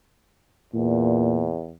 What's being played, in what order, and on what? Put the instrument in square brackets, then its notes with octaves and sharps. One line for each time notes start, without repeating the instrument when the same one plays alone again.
[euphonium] E2 [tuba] A#2